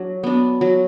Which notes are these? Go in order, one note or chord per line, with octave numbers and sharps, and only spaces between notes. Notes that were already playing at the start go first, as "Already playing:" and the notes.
Already playing: F#3 D4
B3 D4
F#3